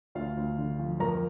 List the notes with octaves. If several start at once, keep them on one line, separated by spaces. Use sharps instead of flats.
D2 F4 F5
D2
D3
F3
F2 A#4 A#5